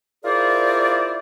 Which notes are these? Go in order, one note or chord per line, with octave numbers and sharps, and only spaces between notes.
E4 F4 G#4 A#4 C5 D5